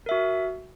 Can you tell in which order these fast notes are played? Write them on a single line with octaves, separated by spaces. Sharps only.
A#4 E5 F#4